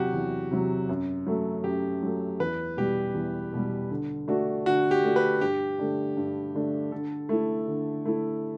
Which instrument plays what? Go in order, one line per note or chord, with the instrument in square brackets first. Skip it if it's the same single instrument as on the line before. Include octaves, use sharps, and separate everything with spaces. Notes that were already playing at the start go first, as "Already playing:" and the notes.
Already playing: [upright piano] E2 C3 F#3 [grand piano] F#4 G4
[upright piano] E2
C3 F#3
F#2
F#3 A3
[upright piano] F#2 [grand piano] G4
[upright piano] F#3 A3
[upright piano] E2 [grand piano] B4
[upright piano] B2 G3 [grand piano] G4
[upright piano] E2
B2 G3
D3
A3 D4 F#4
[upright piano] D3 [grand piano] F#4
[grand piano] G4
[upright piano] A3 D4 F#4
[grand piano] B4
[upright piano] G2 [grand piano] G4
[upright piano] D3 A3 D4
G2
D3 A3 D4
[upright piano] D3 [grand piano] A4
[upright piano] A3 E4
D3
A3 E4